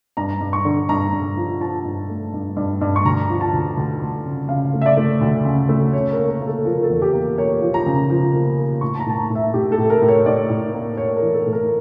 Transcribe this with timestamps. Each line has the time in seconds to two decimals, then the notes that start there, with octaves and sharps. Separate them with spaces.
0.17 G2 A#5
0.41 G2
0.53 C#6
0.65 D3
0.89 G2 A#5
1.13 G2
1.37 F3
1.60 F3 A5
1.85 G2
2.09 A3
2.34 G2
2.57 G2
2.81 G2
2.96 C#6
3.05 D2 A#5
3.30 F3
3.41 A5
3.53 D2
3.78 D2
4.01 D2
4.26 C#3
4.49 C#3 F5
4.74 A3
4.82 E5
4.86 D5
4.97 A3
5.21 D2
5.45 C#3
5.69 A3
5.93 C#3 C#5
6.12 A#3 A#4
6.29 A#4
6.42 A#3
6.47 A4
6.65 F3 A#4
6.83 A4
6.90 E2
7.02 G4
7.13 A#3
7.38 A#3 C#5
7.62 F3
7.74 A#5
7.86 C#3
8.10 F3
8.33 A#3
8.57 A#3
8.81 A2 C#6
8.95 A5
9.00 A#5
9.06 A2 A5
9.18 A#5
9.30 A2
9.35 E5
9.54 A2 G4
9.72 A4
9.78 A2
9.90 A#4
10.02 A2
10.08 C#5
10.26 A2 D5
10.50 A2
10.74 A#3
10.98 A#3 C#5
11.16 A#4
11.22 E3
11.34 A4
11.46 A2
11.53 A#4